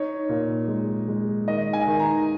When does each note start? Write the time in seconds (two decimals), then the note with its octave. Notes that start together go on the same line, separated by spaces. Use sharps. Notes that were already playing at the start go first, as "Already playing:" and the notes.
Already playing: D#4 C#5
0.29 A#2
0.68 G#3
1.08 G#3
1.48 D#3 D#5
1.73 G#5
1.87 D#3
1.99 A#5